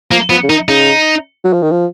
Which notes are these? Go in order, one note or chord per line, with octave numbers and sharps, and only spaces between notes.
F3 A#3
F3 B3
C#3
D#3 D#4
C#3 D#4
F#3
F3
D#3
F3